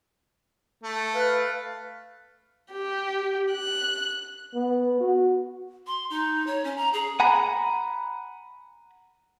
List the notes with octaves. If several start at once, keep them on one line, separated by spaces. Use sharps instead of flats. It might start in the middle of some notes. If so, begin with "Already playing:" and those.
A3
B4 F5
G4
F#6
B3
F#4
C6
D#4
C#5
C#4
A#5
G#4
F#5 G#5 A#5 B5